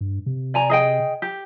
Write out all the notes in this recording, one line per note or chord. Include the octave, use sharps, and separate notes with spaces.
G2
C3
D5 G#5 A#5
G#4 D#5 G5
G4